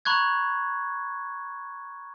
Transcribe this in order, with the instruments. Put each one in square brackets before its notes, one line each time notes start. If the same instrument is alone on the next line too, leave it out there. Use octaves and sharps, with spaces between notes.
[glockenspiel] A#5 B5 C#6 F#6 G#6